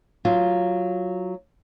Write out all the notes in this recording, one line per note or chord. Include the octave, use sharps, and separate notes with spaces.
F#3 F4